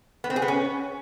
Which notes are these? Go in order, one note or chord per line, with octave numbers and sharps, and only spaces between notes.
B3
C4
G#4
B3
C#4